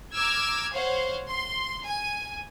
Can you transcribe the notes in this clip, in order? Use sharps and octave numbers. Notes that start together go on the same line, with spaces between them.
A#5 D6 E6 F6 G#6
C5 C#5 F5 F#5
C6
G#5